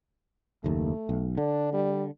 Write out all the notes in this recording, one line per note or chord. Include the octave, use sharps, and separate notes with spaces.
F#1 D#2 A3
B1
D3 D4
G3